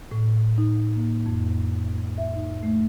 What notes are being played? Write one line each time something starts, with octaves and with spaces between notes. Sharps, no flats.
A2
D#4
A#3
F2
E5
D#4
A3